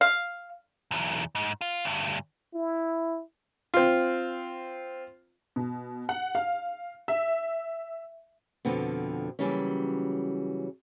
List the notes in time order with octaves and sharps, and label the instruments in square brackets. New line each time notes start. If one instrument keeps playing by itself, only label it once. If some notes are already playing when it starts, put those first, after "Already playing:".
[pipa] F5
[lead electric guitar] B1 E2
G#2
F4
D2 G2
[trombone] E4
[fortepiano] C4 F4
[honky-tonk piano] B2
F#5
F5
E5
[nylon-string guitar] F2 B2 D3 F3 B3
C#3 E3 F#3 G3 A#3 C#4